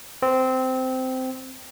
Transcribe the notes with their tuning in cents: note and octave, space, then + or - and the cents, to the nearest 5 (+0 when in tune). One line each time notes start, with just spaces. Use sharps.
C4 -15